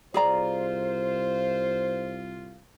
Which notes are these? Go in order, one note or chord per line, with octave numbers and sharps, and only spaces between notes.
C2 F4 G#4 C5 D5 A#5